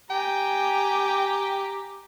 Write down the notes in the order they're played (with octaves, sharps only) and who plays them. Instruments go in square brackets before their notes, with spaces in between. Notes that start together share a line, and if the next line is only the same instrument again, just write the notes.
[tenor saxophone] G4 [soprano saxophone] G5 [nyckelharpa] G#5 A#5